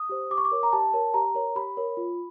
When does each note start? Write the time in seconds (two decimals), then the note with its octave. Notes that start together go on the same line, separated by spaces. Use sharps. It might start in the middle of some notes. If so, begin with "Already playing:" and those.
Already playing: D#6
0.09 G4 C5
0.30 G4 D6
0.38 C#6
0.45 D6
0.51 A#4 C#5
0.63 A#5
0.73 G4 A5
0.93 A#4 C#5
1.14 G4 A#5
1.35 A#4 C#5
1.55 G4 B5
1.77 A#4 C#5
1.97 F4